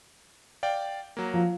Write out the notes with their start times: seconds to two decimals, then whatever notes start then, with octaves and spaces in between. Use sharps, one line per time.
0.63 D5 F5 G5
1.17 F#3 A#3
1.33 F3